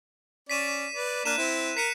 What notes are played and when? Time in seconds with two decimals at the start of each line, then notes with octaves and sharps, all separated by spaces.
0.50 C#4 D5 B6 D#7 E7
0.93 B4 D5
1.25 A#3 D4 A#4 F#6 D#7 E7
1.38 C4 E4
1.77 A#4 B6 C#7 D#7